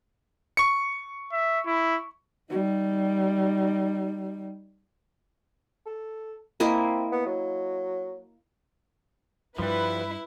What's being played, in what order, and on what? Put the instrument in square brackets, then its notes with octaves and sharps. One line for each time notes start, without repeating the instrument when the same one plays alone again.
[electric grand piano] C#6 C#7
[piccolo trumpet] E5
E4
[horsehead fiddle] G3 D#4
[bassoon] A4
[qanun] A#3 E4 D#5 [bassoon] C4
[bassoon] B3
F#3
[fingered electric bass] G2 [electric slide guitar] F3 G3 [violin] E4 [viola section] B4